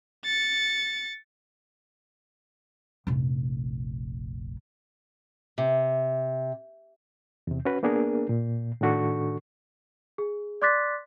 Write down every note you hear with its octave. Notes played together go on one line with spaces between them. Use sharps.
A6 C#7
F1 A#1
C3
E2 C3
C#4 F#4 B4
A#3 B3 D4 G#4 A#4
A#2
A2 D#3 D4 F#4 A4 C#6
G#4
D5 C6 D6 F#6 A6 B6